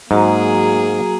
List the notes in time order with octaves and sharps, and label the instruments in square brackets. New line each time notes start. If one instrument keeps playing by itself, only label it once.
[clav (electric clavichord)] G#2 [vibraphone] F#3 F#4 A#5 [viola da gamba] A#3 G#4